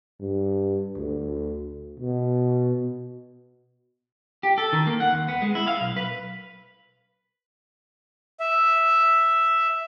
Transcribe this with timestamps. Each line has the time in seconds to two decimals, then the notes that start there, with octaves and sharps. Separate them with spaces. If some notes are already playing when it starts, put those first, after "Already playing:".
0.21 G2
0.98 D2
2.00 B2
4.43 G4
4.58 A4
4.73 D#3
4.87 A#3
5.00 F#5
5.13 D#2
5.28 B3
5.42 G#3
5.55 E4
5.67 F5
5.81 B1
5.97 B4
8.40 E5